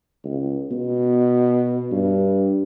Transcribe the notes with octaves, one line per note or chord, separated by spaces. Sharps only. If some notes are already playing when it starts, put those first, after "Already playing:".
C#2
B2
G2